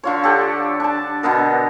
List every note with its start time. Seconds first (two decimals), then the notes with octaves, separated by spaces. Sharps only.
0.04 D3 F4 C#5
0.24 G4 A4 F#5
0.80 D4 A5
1.23 B2 D3 B3 A#4